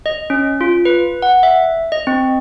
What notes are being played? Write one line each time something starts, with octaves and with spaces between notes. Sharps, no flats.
D#5
C#4
F4
B4
F#5
E5
D#5
C4